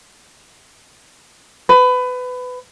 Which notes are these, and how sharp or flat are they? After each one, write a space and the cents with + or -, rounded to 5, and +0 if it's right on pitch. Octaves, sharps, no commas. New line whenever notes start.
B4 +25